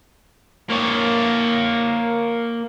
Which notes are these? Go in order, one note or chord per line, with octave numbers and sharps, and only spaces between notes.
A#3 C#5